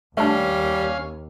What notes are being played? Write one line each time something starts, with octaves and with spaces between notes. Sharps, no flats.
D#2 G3 A3 C#4 D4 F5